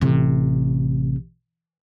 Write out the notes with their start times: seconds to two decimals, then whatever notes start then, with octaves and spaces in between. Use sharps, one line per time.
0.01 A1 C3